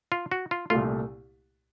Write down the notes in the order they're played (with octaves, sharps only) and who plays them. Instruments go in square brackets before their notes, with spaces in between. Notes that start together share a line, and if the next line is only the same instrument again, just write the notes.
[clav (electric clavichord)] F4
F#4
F4
[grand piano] C2 A#2 A3 [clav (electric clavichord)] F4